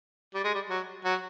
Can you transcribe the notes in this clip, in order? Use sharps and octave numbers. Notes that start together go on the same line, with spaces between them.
G3
G#3
G3
F#3
F#3